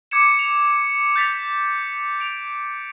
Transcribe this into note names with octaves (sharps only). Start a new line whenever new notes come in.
D6 G#6 C#7 E7
F7
G6 A6 B6 F7
D7 F7